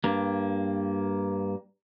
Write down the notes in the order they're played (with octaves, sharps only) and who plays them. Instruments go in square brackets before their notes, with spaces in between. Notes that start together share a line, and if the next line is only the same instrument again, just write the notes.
[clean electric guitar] G2 A#3